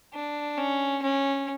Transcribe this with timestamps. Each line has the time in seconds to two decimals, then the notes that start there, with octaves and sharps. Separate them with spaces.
0.14 D4
0.58 C#4
1.02 C#4